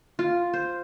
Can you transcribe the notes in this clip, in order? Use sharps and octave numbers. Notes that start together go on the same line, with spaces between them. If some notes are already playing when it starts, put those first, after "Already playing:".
F4
C5